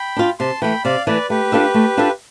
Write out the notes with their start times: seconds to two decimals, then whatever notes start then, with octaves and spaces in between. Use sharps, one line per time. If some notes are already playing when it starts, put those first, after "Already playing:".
Already playing: G5 B5
0.16 D4 F4
0.39 C3 A5 C6
0.61 E3 A3 G5 B5
0.84 C3 D5 F5
1.06 E3 A3 B4 D5
1.29 A3 G4 B4
1.52 D4 F4 A4 E5
1.74 A3
1.97 D4 F4 A4 E5